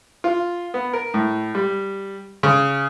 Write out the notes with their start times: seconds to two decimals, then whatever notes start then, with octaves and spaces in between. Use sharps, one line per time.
0.24 F4
0.74 B3
0.93 A#4
1.14 A2
1.55 G3
2.43 C#3